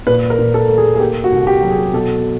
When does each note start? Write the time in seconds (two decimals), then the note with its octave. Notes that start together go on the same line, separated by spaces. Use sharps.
0.07 A#2 B4
0.30 A#4
0.39 A#2
0.54 A4
0.69 A3
0.78 G#4
0.95 G#4
1.00 A#3 G4
1.24 F#4
1.32 C2
1.47 G4
1.62 F#3
1.70 G#4
1.93 B2 A4